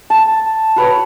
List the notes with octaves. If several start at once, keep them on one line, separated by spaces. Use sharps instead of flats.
A5
F#4 B4 C#5